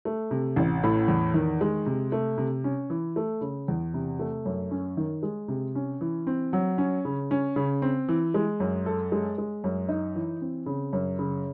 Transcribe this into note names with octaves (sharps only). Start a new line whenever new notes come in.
A3
C3
A1
A2
E2
D#3
G#3
C3
A3
C3
C#4
E3
A3
C#3
E2
C3
A3
F#2
C#4
D#3
G#3
C3
C#4
E3
C4
F#3
C#4
C#3
C#4
C#3
C4
E3
G#3
F#2
A4
G#3
G#3
F#2
D#4
E3
C4
C#3
F#2
C#3